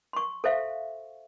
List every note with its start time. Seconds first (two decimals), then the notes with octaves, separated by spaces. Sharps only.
0.13 C6 C#6
0.44 A4 C5 E5 F5